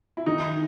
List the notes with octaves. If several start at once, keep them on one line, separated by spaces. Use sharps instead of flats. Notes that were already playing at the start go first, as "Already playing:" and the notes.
E4
D#3 D#4